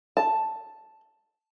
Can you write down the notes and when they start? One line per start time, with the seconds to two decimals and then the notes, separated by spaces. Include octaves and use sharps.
0.17 A5